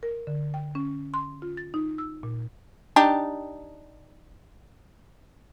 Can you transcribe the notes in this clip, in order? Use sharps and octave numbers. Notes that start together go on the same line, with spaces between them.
A#4
D3
G5
C#4
C6
F4
A6
D#4
E6
A#2
D4 D#4 G4